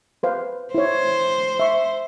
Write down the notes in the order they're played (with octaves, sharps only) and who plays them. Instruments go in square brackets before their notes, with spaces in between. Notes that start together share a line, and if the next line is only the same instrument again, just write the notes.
[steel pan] B4 C5 F5
[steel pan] E4 C#5 [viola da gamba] C5
[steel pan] E5 C#6